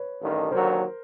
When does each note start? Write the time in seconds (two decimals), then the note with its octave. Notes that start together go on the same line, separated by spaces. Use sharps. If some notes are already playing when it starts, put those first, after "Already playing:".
Already playing: B4 C#5
0.20 A1 G2 D#3
0.51 D#2 D3 F#3 A#4 C5